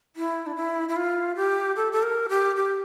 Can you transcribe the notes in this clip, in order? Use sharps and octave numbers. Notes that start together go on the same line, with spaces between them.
E4
D4
E4
E4
F4
G4
A4
A4
A#4
G4
G4